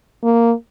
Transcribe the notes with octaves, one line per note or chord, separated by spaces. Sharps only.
A#3